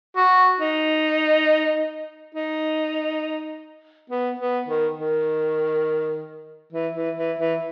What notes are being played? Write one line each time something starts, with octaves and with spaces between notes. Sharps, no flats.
F#4
D#4
D#4
B3
B3
D#3
D#3
E3
E3
E3
E3